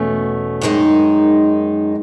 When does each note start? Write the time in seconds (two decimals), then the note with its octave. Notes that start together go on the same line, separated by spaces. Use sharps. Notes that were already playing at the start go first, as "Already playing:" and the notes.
Already playing: E2 B2 A3 C#4
0.61 F#2 D#3 G#3 D#4